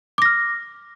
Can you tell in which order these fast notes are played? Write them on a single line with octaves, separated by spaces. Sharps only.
D6 A#6 F6